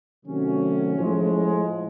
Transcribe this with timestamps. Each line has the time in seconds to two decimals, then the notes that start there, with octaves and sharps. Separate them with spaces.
0.24 C3 D#3 F#3 A3 C#4
0.96 A2 F3 G#3